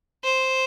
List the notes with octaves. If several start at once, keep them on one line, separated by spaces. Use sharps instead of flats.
C5